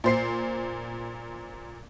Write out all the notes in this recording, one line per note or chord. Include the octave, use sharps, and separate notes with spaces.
A#2 C5 C7